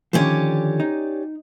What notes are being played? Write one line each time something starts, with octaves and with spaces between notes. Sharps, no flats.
D3 D#3 F3 C#4 G4 D5
D#4